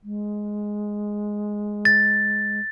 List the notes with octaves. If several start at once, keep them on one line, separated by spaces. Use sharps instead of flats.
G#3
A6